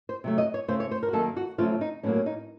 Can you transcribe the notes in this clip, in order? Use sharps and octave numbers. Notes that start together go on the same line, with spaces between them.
C5
C3 F#3 A3
D#5
C#5
C#3 A3 C4 C5
C#5
C5
A#4
F#4
F#2 D#3 A#3 A4
F#4
F#2 C#3 F3 A3 C4 F4
D#4
A2 F#3 A#3 C#4
C#4
D#4